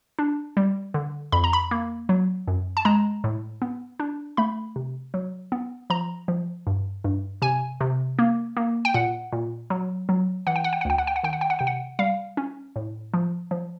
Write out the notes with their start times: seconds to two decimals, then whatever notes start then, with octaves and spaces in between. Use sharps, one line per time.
0.19 D4
0.57 G3
0.94 D3
1.32 F2 B5
1.44 A#5
1.53 B5
1.71 A#3
2.09 F#3
2.48 F#2
2.77 A5
2.85 G#3 A#5
3.24 A2
3.62 B3
4.00 D4
4.37 A3 B5
4.76 C3
5.14 F#3
5.52 B3
5.90 F3 A#5
6.28 F3
6.67 G2
7.04 G2
7.42 C3 G#5
7.81 C3
8.19 A#3
8.57 A#3
8.85 G5
8.94 A#2 F#5
9.32 A#2
9.70 F#3
10.09 F#3
10.47 E3 F#5
10.56 G5
10.64 F#5
10.73 G5
10.81 F#5
10.85 D2 G5
10.98 F#5
11.07 G5
11.16 F#5
11.23 D#3 G5
11.33 F#5
11.41 G5
11.50 F#5
11.59 C3 G5
11.67 F#5
11.99 G3 F5
12.37 C#4
12.76 A2
13.14 F3
13.51 F3